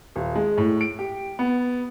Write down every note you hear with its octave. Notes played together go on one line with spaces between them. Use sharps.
D#1
G#3
A2
D7
G4
B3